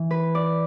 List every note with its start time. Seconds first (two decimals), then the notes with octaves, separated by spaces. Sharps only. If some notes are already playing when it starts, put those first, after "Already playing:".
Already playing: E3
0.11 B4
0.35 D5